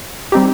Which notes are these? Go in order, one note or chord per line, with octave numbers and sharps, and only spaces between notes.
G3 C4 D#4 G4